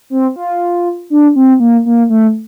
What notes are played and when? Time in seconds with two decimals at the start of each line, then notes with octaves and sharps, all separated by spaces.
0.10 C4
0.36 F4
1.10 D4
1.36 C4
1.60 A#3
1.86 A#3
2.10 A3